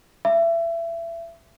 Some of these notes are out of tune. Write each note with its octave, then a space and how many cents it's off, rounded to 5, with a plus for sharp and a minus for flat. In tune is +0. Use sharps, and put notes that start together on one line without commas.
E5 +30